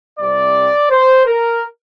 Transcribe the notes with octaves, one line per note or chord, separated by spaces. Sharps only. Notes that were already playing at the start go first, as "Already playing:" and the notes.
C2 C3 G3 C4 D5
C5
A#4